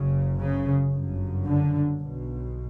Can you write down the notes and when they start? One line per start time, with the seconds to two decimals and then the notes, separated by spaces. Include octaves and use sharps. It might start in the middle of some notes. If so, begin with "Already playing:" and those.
Already playing: F#1 F#2 C#3
0.36 C#3
0.90 G1 F#2 C#3
1.45 D3
2.01 B1 B2